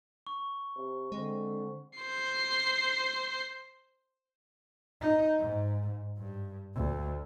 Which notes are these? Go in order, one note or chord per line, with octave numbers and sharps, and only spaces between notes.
C#6
C3
D3 G#3 C4
C5 C7
D#4
G#2
G2
D2